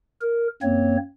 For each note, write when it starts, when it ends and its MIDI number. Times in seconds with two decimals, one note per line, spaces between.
0.21 0.48 70
0.62 0.97 42
0.62 0.97 58
0.62 0.97 60
0.62 0.97 73